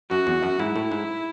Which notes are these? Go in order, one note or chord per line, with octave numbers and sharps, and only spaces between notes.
F#2 F#4
E2
F#2
G#2 E4
A2
G#2